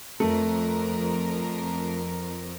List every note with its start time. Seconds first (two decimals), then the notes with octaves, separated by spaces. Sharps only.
0.20 F2 A3 A#4